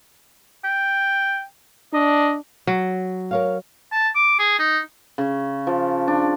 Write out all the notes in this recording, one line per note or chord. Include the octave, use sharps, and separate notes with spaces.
G5
D4 D#5
F#3
A#4 C#5 F5
A5
D6
G#4
D#4
C#3
F3
D4